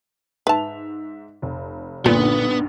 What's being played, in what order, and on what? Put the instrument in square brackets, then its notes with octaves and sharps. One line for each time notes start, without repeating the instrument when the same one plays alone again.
[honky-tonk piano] G#2 E5 F7 [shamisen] B4 A5
[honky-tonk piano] F1
[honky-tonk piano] B1 G2 D3 [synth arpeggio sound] A#2 [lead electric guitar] B3 [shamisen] B5